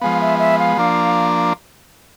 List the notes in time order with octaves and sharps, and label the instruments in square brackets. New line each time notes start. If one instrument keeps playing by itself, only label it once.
[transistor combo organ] F3 G#3 B3 [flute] F5
[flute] E5
E5
F5
[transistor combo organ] F3 A#3 D4